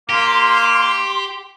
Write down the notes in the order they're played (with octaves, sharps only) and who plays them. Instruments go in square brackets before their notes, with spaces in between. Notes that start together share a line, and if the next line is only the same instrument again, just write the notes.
[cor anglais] A#3 [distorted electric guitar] G4 [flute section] C6